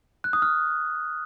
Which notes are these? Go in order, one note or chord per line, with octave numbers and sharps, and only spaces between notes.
F#6
D#6
F6